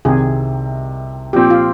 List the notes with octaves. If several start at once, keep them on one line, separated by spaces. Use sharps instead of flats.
C2 C3 D#3 G#4
A#2 F3 C4 G4
F4